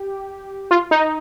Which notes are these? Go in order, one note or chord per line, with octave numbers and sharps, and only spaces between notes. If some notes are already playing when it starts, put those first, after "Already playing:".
Already playing: G4
F4
D#4